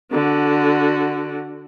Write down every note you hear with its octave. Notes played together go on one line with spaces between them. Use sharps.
D3 F#4